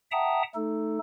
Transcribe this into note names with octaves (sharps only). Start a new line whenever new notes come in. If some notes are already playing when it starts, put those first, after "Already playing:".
E5 F#5 G5 A5 A#5 D#6
A3 D#4 A4